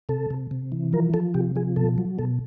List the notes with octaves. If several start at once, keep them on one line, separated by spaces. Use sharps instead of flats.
C3 A4
C3
C3
E3
F3 A#4
F3 A4
C3 G4
F3 G#4
B2 A4
F#3
B2 A4